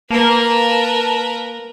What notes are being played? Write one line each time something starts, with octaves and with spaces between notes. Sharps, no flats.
A#3 A#4 B4 A5